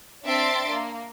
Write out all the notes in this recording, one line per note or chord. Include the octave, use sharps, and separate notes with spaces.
C4 D4 E5 C6 A6 D7
A#3